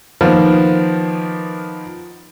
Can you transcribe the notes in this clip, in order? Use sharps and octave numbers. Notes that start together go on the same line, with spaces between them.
D#3 F3 A#3 B3